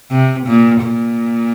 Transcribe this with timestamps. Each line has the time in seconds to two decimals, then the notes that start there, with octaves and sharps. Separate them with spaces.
0.10 C3
0.46 A#2
0.83 A#2